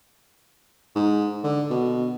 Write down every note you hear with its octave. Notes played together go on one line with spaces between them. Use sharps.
G#2
D3
B2